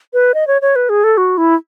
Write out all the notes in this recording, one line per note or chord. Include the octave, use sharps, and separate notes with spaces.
B4
D#5
C#5
C#5
B4
G#4
A4
F#4
E4